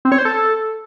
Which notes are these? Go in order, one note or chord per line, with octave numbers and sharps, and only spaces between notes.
C4
C#5
C5
A4